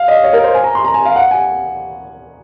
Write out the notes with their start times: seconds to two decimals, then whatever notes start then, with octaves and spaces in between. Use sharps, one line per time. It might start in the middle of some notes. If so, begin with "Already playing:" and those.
Already playing: F5
0.08 D#5
0.23 C#5
0.33 A#4
0.44 C5
0.54 G#5
0.64 A#5
0.75 C6
0.85 A#5
0.94 G#5
1.05 F5
1.16 F#5
1.31 G#5